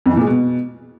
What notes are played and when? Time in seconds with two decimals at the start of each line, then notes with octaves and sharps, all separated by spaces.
0.06 F2
0.11 E3
0.16 A#2
0.22 G#3
0.27 B2